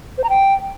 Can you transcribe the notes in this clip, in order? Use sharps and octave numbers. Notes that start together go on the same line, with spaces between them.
C5
A#5
G5